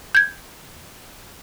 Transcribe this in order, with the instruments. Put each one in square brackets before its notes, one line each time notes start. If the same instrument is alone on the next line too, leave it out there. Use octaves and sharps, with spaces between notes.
[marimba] G6 G#6